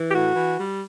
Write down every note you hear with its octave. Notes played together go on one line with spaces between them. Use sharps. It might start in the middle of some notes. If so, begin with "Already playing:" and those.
Already playing: E3
G4
A2 F#4
E3
G3